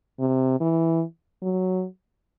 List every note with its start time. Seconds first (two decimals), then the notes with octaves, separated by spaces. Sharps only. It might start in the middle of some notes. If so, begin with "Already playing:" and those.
0.19 C3
0.60 E3
1.42 F#3